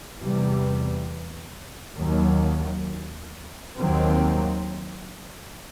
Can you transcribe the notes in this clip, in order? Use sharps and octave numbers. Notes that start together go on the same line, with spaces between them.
E2 C3 E3 G3
D#2 D#3 F#3
D#2 D#3 F#3 C4